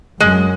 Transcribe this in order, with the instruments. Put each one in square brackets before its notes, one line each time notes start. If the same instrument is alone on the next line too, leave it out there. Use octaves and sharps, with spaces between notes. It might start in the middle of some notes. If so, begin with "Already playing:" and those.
[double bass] F#2 [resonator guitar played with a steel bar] G#3